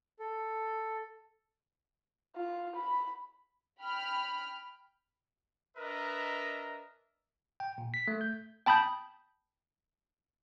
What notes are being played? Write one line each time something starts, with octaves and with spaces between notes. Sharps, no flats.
A4
F4
B5
G5 B5 F6
D4 A#4 B4 D#5 E5 A#5
G5
A#2
B6
A3
G6
G5 A5 B5 D#6 G6